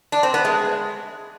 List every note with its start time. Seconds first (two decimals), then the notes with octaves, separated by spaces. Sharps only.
0.12 D4
0.23 C4
0.34 B3
0.45 G#3